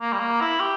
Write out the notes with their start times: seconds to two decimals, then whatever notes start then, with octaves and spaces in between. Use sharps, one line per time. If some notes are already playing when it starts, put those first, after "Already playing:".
0.01 A#3
0.13 G3
0.20 A#3
0.41 E4
0.60 G4